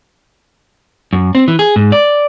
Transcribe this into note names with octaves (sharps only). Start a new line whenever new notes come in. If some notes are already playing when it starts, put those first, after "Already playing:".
F#2
C4
E3
G#4
G#2
D5